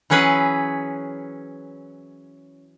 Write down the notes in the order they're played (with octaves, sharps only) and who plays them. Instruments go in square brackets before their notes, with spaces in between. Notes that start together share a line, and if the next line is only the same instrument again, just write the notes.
[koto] E3 F#3 C#4 G#4 B4 E5